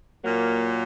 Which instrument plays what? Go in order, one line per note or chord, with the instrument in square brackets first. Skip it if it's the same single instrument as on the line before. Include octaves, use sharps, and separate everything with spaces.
[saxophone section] A#2 F#3 A#3